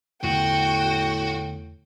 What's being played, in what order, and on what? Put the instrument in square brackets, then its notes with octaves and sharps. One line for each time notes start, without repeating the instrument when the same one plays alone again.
[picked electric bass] E2 D3 B3 [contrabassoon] A2 [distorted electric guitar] F#4 [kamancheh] G5